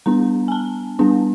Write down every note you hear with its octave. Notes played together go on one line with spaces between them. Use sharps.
G3 B3 D4 A#5
G#5
A5
G3 B3 D4